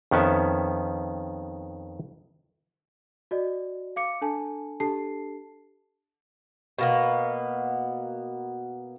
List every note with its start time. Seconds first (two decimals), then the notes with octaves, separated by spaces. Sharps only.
0.11 F2 D#3 B3 C#4 E5 A5
3.31 F#4 D5 D#5
3.96 F5 D6 C#7
4.21 D4 A4 G#5 A5
4.80 D4 G4 A4 A5 C7
6.78 B2 A#3 B3